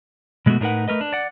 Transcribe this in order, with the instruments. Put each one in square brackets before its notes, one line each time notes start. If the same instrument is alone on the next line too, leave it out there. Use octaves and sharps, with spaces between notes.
[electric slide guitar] B2 G#3 A3 B3 F#4
A2 D4 D#4 A#4 B4 F#5
A3 A#4 B4 D#5
D4
D5 F#5